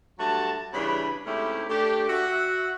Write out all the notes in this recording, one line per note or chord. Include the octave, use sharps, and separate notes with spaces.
G2 F#3 A3 F#4 A5
G2 C#3 E3 D4 B5
G#2 C3 A3 C#4 E4 G4
A3 D4 G4
F#4 E5 F#5